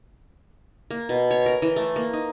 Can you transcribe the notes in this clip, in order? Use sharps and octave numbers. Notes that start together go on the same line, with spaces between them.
A#3
B2
C#5
A#4
E3
A3
A#3
D#4